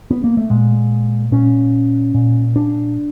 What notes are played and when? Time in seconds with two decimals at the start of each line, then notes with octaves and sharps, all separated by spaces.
0.11 B3
0.24 A#3
0.37 A3
0.50 A#2 G#3
1.32 A#2 C#4
2.14 A#2
2.56 D4